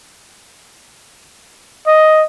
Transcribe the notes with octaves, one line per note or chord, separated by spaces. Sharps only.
D#5